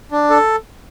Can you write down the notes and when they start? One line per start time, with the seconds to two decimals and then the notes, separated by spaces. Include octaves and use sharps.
0.12 D4
0.30 A4